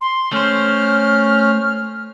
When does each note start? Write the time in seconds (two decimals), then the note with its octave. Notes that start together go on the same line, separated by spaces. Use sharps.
0.01 C6
0.32 A3 C#4 C5 F6